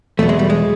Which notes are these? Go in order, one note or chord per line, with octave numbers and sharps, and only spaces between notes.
E2 B2 F#3 A3
G#3
G3
G#3